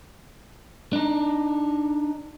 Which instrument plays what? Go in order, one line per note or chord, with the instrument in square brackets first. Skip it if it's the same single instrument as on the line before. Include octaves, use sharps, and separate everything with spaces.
[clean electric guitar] D4 D#4